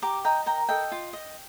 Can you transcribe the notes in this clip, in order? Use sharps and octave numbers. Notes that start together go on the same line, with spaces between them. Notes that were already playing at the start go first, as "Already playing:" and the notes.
G4 A#5 D6
D#5 G5 A#5
A#4 G5 A#5
A4 D#5 G5
F4
D#5